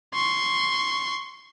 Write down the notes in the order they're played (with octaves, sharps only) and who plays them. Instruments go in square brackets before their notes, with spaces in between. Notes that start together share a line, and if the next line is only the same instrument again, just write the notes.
[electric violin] C6 C#6